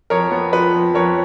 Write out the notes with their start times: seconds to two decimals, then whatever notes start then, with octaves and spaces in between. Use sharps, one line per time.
0.10 F2 A#4 C#5
0.32 B3
0.53 F3 B4
0.74 F2
0.94 F2 A#4 C#5